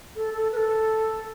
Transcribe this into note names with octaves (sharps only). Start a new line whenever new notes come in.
A4
A4
B4
A4